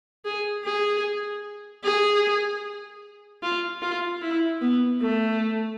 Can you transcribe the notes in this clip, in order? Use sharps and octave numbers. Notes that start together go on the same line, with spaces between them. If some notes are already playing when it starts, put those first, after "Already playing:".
G#4
G#4
G#4
F4
F4
E4
B3
A3